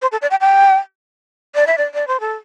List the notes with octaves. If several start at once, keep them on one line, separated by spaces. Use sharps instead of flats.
C5
A4
D5
G5
G5
D5
E5
D5
D5
C5
A4